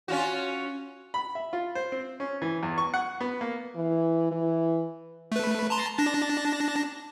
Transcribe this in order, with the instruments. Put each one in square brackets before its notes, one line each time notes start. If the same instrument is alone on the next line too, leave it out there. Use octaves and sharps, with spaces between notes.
[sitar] C#4 F4 F#4
[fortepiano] B5
E5
F4
C5
C4
C#4
E3
E2
C#6
F#5
B3
A#3
[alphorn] E3
E3
[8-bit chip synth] A3 B4
A5 A#5 C6
D4 A5 A#6